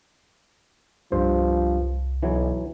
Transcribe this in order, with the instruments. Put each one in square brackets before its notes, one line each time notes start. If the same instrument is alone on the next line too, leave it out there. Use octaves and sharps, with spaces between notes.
[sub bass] C2 [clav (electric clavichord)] G2 C5 [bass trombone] F3
[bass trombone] B1 [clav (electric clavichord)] E3 F#3 G#5